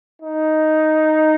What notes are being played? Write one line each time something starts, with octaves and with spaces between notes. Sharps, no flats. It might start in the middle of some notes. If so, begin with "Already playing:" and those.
D#4